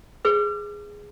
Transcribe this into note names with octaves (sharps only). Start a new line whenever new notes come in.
G#4 B4